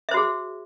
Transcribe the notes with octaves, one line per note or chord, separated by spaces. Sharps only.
F#4 G#4 C5 E5